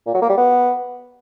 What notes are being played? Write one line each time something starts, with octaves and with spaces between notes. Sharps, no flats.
A#2
F#3
A#3
G3
B3